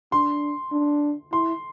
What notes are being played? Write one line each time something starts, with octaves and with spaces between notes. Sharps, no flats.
D4 C6
D4
E4 C6